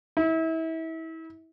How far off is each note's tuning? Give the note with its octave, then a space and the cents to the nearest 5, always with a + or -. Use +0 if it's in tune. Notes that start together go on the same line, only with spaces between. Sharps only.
E4 -30